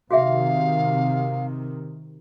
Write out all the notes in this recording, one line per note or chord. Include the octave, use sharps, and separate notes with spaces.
C3 D#3 F#4 G#4 E5 F5